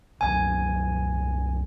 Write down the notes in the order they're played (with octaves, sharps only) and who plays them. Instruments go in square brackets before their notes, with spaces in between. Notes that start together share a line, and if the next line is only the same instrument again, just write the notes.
[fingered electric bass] C2 F#2 F#3 [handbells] G#5